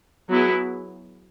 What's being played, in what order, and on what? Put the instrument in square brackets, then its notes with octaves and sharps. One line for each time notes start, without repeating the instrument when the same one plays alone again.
[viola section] F#3 B3 E4 G#4